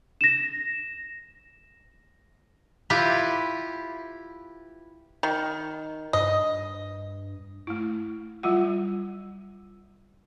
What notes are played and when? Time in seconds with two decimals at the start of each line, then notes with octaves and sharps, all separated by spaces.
0.21 A#6 E7
2.90 E4 F4 G4 B4
5.23 D#3
6.13 G2 D#5
7.67 A3 E4
8.43 F#3 G3 F4 F#5